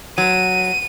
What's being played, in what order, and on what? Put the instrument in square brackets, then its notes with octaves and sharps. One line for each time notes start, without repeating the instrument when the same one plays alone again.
[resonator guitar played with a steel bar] F#3 [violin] D#7